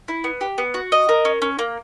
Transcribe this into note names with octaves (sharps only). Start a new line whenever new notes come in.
E4
B3
G4
B3
F#4
D#5
A#4
C#4
C#4
A#3